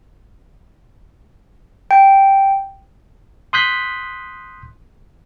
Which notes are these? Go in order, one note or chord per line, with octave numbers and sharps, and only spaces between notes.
G5
C6 D#6 F#6 G6 B6